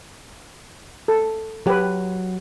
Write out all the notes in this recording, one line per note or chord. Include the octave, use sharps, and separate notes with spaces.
A4
F#3 G4 B4